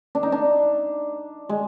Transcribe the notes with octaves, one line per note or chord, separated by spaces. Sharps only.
D4
D#4
D4
G#3